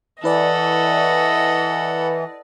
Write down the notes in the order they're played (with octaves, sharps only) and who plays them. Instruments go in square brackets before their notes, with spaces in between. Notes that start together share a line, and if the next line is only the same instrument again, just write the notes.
[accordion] E3 [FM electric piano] E4 B4 D5 [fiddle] A4 F#5 [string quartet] D#5